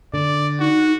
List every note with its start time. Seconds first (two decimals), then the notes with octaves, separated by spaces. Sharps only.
0.14 D3 D5
0.60 D#4 F#4